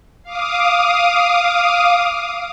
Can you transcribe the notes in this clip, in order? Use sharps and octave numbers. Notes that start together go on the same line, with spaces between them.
F5 D6 D#6